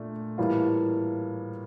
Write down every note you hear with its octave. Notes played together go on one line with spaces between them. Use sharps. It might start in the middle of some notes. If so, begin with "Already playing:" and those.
Already playing: A#2 A3 D4
A2 E3 G3 A#3 F4